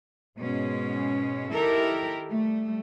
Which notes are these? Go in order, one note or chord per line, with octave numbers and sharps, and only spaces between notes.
G#2 B2 G#3 C#4
D#3 E4 G4 A4 A#4
G3 A3